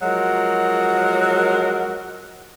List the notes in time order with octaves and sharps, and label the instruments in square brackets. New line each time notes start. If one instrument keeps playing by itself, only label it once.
[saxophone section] F3 F#3 G#3 F#4 A#4